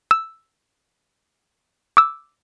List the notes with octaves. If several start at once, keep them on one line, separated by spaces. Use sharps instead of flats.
E6
D6 E6